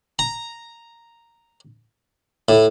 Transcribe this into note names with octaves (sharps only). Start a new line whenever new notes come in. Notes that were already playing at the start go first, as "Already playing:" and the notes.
A#5
A2